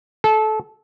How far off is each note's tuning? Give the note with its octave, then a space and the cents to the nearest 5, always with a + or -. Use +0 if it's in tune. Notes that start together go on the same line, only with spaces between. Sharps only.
A4 -20